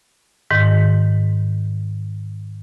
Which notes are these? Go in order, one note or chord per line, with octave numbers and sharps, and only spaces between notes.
G#2 D#3